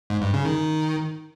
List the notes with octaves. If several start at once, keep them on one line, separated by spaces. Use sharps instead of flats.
G#2
G2
C#3
D#3